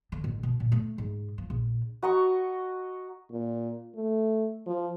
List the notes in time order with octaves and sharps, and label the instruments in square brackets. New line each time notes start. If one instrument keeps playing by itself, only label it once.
[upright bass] D3
A1
B2
A#2
A3
G#2
F3
A#1
[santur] F#4 D#5 A#5 C#6
[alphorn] A#2
A3
F3